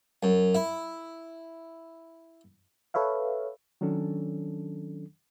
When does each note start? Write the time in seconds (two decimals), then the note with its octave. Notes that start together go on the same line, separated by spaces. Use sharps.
0.23 F#2
0.55 E4
2.94 A4 B4 C#5 E5 F5
3.81 D#3 F#3 C#4 D4 A4